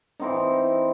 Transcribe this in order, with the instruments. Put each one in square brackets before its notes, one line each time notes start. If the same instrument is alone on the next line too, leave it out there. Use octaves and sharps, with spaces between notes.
[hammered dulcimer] E3 C4 D#4